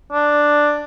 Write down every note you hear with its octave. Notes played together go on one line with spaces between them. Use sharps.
D4